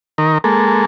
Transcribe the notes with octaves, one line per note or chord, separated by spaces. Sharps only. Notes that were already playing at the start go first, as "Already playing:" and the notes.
D#3 A#4
G#3 A#3 A4